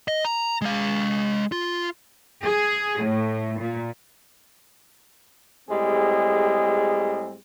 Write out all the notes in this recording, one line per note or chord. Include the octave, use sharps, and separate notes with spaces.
D#5
A#5
G#3 F5
F4
G#4
A2
A#2
A2 G3 G#3 C4 G#4